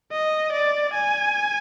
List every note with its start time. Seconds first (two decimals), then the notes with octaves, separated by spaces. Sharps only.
0.12 D#5
0.52 D5
0.94 G#5